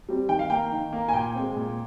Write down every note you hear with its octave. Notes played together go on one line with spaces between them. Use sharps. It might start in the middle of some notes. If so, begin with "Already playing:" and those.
G3 C4
D#3 G5
F5
A#3 G5
D#3
A#3
G#5
A#2 G5
G#3 C4
A#2